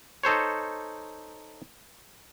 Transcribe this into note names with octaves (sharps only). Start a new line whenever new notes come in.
D#4 A4 C5 C#5